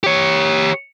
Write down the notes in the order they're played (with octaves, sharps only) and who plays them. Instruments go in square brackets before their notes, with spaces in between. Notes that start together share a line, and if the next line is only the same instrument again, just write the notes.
[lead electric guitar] G4 C#5